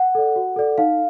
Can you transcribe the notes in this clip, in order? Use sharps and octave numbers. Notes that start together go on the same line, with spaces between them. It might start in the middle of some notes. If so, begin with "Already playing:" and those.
Already playing: F#5
A4 D5
F#4
A4 D5
D#4 F5